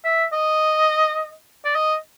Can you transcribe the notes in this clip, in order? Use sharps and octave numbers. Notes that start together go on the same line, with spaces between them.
E5
D#5
D5
D#5